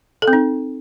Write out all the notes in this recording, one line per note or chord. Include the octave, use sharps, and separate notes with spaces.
A4
C4
D#4